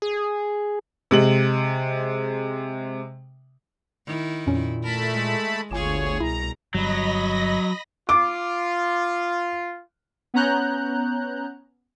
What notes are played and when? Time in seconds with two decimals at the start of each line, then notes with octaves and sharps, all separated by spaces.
0.02 G#4
1.11 C3 G#3 F#7
4.06 D#3 E4
4.47 F2 A#2 C#4
4.84 A3 A#4 A5 B5
5.14 G#3
5.71 G1 D2 F4 G#4 C#5 G#5 D6 E7
6.20 C2 B2 E4 A#5
6.74 G1 F#3 G3 D#5 B5 A#6
8.09 F4 D6
10.34 B3 C#4 C#5 A#5 F#6 G6